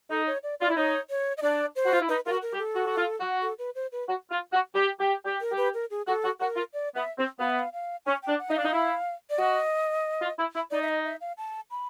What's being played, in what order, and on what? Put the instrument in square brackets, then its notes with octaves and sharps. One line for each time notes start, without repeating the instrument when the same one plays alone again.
[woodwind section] D#4 [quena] A4
[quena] C#5
D5
[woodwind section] F4 [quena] D5
[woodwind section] E4
[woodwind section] D#4 [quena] C#5
[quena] C#5
D#5
[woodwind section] D4 [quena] D5
[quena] C5
[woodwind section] F#4
F4
E4
[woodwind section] D#4 [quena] B4
[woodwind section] F4 [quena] A#4
[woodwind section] F#4
[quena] A#4
[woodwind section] G4
[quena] A4
[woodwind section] F#4
F#4
F4
F#4
[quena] A4
B4
C5
B4
[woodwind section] F#4
F4
F#4
G4
G4
G4
[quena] A#4
[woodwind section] G4
[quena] B4
A#4
G#4
[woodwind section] F#4 [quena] A4
[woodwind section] F#4
[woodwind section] F#4 [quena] A#4
[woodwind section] F4
[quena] D5
[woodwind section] B3 [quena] E5
[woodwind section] C4
[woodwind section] B3 [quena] F5
[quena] E5
F5
F5
[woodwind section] C#4 [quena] G#5
[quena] G5
[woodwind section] D4
[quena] F#5
[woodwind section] D#4 [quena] E5
[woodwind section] D4 [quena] F5
[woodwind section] D#4
E4
[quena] D5
[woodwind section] F#4 [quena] D#5
[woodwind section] F4
E4
E4
[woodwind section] D#4 [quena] D5
[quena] E5
D#5
E5
F5
A5
B5